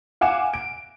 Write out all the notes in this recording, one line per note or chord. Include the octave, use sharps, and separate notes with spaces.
F5 F#5 G#5 D6 E7
D7